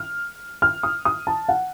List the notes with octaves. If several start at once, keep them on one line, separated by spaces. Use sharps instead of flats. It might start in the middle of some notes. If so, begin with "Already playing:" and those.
Already playing: F6
F6
D#6
D#6
A5
F#5